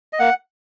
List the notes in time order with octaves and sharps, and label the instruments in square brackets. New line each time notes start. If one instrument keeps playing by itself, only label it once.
[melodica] D#5
A#3 F#5